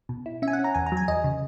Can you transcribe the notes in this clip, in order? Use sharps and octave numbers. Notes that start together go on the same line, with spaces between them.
B2
E4
C#4 E5
G#5
F#5
C#4
A#5
E2 G#5
A#5
F#3
G#5
E2 D#5
C#3